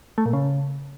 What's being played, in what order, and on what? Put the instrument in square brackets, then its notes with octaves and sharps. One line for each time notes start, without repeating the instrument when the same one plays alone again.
[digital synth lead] A3
A#2
C#3